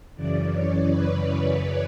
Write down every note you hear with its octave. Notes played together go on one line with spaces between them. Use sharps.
F#2 C#3 E3 D5
C#5
B4